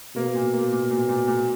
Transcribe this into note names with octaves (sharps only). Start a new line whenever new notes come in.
B2 A#3
A#2
A#3
A#2
A#2
A#2
A#2